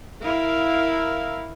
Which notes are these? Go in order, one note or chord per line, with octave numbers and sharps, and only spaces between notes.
E4 A#4 F5